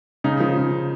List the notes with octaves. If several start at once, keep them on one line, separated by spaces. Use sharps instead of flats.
C#3 D#4
F3
C#3